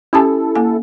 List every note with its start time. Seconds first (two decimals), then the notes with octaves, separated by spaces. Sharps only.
0.13 C#4 E4 G4 A4 G#5
0.55 A#3 G#5